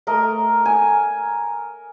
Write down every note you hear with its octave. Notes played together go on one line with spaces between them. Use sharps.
A3 A#4 D#5
G#5